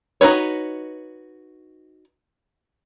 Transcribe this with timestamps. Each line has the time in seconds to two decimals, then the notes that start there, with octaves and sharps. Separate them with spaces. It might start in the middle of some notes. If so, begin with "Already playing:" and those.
0.21 D#4 F#4 B4 C#5